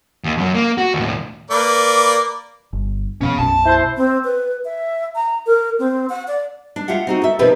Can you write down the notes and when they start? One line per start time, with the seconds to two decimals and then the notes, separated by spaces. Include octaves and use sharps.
0.24 D#2
0.38 F#2 F#3
0.55 A#3
0.78 F#4
0.94 D#2 A2
1.51 A#3 B4 D5
2.73 G1
3.21 F2 B2 C#4 F5
3.39 B1 F#2 A5
3.66 E4 C5
3.97 C4
4.24 B4
4.65 E5
5.15 A#5
5.46 A#4
5.79 C4
6.09 F#5
6.28 D5
6.76 D4
6.88 F4 G4 E5 F#5
7.07 C4 D#4 F#4
7.22 A4 E5
7.39 B2 D#3 F3 C4 G4 B4